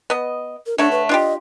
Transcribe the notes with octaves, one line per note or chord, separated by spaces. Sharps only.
B3 D#5
A#4
D3 A3 D4 C#5
B4
D4 F4 G4 D#5